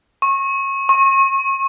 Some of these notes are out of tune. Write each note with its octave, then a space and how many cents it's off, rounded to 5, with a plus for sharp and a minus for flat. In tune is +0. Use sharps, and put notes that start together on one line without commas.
C#6 -25
C#6 -35